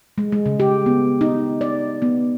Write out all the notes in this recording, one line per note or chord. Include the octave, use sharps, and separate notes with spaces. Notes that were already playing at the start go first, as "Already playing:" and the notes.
G#3
G#3
C#3
G4
B3
D#4
D5
B3